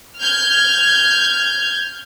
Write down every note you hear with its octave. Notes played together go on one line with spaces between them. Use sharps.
F6 G6 G#6